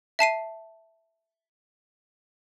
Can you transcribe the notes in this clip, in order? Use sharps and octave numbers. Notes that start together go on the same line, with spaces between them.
E5 A5 C7 D#7